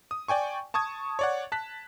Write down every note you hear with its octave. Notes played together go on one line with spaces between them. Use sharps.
D#6
D5 G5 G#5 C#6
A5 C#6 D#6 G#6
C#5 D5 F#5
A5 F#6 B6